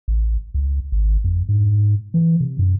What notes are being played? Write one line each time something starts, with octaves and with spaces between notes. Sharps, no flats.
A1
C#2
G#1
F2
G#2
E3
C3
F#2